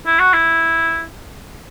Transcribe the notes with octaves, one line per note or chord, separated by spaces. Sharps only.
E4
F#4
E4